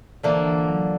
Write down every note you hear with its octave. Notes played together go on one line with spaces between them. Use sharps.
D3 E3 F3 A#3
E3
F#3